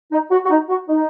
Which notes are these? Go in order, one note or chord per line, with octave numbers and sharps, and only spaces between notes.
D#4
F#4
F#4
D#4
F#4
D#4